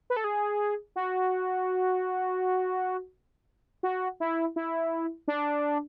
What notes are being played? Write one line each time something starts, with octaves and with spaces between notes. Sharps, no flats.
B4
A4
G#4
F#4
F#4
E4
E4
D4